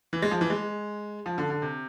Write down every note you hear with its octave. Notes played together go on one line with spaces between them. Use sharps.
E3
G#3
F3
E3
G#3
F3
D3
D3
C3